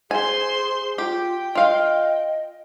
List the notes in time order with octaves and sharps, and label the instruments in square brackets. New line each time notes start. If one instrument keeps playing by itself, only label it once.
[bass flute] G#4 [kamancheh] C5 C6 [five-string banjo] G#5
[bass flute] F4 [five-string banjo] G4 [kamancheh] G5
[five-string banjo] F4 F5 [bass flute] D#5